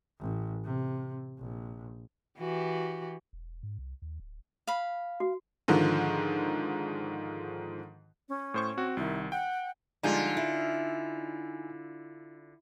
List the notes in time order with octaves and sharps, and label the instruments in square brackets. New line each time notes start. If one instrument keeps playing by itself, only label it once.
[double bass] A1
C3
A#1
[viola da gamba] E3 F#4 G4
[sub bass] E1
G#2
C2
D#2
D1
[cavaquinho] F5 B5
[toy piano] F#4
[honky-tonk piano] G#2 D3 D#3 F3
[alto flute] C#4
[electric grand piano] A2 C5 C#6
C4 F#4
[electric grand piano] C2 D#3 [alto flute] E4
[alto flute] F#5 [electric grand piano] G5
[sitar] D3 F4 [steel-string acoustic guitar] F3 G3 G#3 [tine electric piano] D#4 G#5 G6
[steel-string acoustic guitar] E4